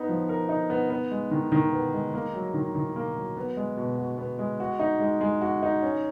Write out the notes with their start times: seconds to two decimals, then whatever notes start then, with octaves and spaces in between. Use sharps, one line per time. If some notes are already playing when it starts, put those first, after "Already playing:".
Already playing: B3 D#4
0.09 F3
0.29 A#4
0.49 D#4
0.70 B3
0.90 B3
1.11 G#3
1.31 D#3
1.52 D#3
1.72 B3
1.94 G#3
2.14 A#3
2.34 F#3
2.54 D#3
2.75 D#3
2.96 A#3
3.16 F#3
3.37 B3
3.57 G#3
3.77 B2
3.98 F#4
4.18 B3
4.39 G#3
4.60 F#4
4.80 D#4
5.00 G#3
5.21 G#3
5.41 F#4
5.62 D#4
5.82 C#4